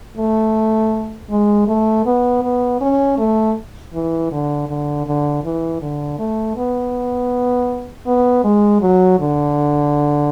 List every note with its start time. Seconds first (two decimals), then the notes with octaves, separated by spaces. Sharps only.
0.18 A3
1.30 G#3
1.68 A3
2.06 B3
2.43 B3
2.81 C#4
3.18 A3
3.94 E3
4.31 D3
4.68 D3
5.06 D3
5.44 E3
5.81 D3
6.19 A3
6.57 B3
8.06 B3
8.44 G#3
8.81 F#3
9.19 D3